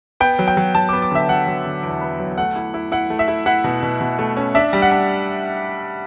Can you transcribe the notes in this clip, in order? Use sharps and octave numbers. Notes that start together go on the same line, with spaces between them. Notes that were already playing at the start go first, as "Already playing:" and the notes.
B3 G5
F#3
G5
F#3
F#3 A5
D6
B3
D6
D3 E5
F#3 F#5
F#3
D3
E2
B3
F#3
A3 F#5
E4
E4
E4 F#5
A3
E5
E4
E4 F#5
B2
B2
B2
A3
C#4
D4 E5
G3
F#5
D4